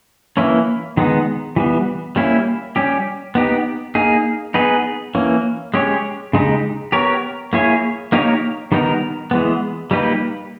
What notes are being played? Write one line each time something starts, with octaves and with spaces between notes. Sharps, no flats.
E3 A#3 C#4 E4
D#3 G#3 B3 D#4
E3 G3 B3
G3 A#3 C#4 E4
G3 C#4 G4
B3 D#4 G4
A#3 D#4 G#4
B3 D#4 G#4 B4
E3 A#3 C#4
G#3 C#4 G4 C#5
C#3 G#3 D#4 G4
B3 G4 A#4 C#5
A#3 E4 G#4 C#5
A#3 D#4 G4 A#4 C#5
D#3 G3 B3 D#4 A#4
E3 G#3 B3
G3 A#3 D#4 G4 B4